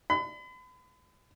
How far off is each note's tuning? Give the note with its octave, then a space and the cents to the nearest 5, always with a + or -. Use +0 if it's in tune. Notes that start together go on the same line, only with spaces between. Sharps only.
B5 +40